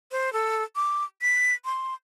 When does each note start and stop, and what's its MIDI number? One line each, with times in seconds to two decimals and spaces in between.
0.11 0.32 72
0.33 0.63 69
0.76 1.04 86
1.22 1.54 95
1.65 1.94 84